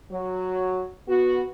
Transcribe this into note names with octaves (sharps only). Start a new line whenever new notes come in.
F#3
B3 F#4